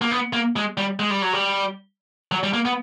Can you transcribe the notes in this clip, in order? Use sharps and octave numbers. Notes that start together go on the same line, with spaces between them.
A#3
B3
A#3
G#3
G3
G#3
G3
F#3
G3
F#3
G3
A#3
B3